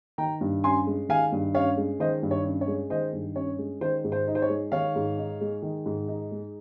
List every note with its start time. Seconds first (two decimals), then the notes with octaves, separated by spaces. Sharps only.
0.18 D#3 G5 A#5
0.41 G2
0.64 C#4 G#5 C6
0.87 G#3
1.09 D#3 F5 G#5
1.32 G2
1.55 C#4 C#5 F5
1.77 G#3
2.00 D#3 C5 D#5
2.23 G2
2.31 C#5
2.45 C#4
2.61 C#5
2.68 G#3
2.90 D#3 C5 D#5
3.13 G2
3.36 C#4 C#5
3.59 G#3
3.81 D#3 C5
4.04 G#2
4.12 C5
4.28 D#4
4.35 C5
4.42 C#5
4.49 G#3
4.72 D#3 C#5 F5
4.96 G#2
5.18 D#4
5.41 G#3
5.62 D#3
5.86 G#2
6.08 D#4
6.31 G#3